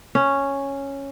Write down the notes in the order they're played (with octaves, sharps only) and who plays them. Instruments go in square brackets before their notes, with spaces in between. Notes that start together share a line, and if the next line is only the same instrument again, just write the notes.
[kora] C#4